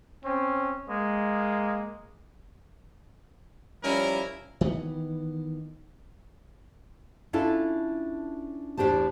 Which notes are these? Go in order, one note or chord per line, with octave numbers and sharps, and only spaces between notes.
C4 C#4
G#3 A#3
F3 G3 C#4 E4 A#4
D#3 E3 A3 B3
C#4 D4 E4 F4 A4 A5
E2 A2 D4 G4 C5 A5